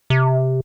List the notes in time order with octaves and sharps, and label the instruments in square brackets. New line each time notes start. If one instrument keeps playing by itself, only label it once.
[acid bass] C3